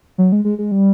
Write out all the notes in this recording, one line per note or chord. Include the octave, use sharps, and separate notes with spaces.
F#3
G#3
G#3
G#3
G3